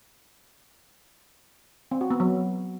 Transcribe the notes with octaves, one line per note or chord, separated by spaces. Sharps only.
C4
F#4
B3
F#3